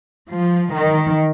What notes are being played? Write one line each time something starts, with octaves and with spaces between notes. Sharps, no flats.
F3
D#3